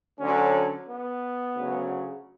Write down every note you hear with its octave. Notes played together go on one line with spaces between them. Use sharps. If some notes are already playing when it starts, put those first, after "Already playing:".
D2 D3 F#3 C#4
B3
D2 C#3 F#3